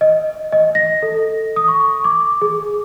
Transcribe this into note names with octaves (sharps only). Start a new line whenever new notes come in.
D#5
D#5
A#6
A4
D#6
C#6
D6
G#4